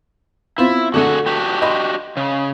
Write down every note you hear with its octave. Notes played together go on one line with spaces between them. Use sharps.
B3 C4 E4 F4
D3 A3 F#4 G#4 F#5
D4 F#4 G4
D#5 B5 C6
C#3